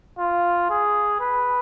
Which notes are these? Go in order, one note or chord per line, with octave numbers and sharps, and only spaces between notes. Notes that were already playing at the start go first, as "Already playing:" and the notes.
F4
G#4
B4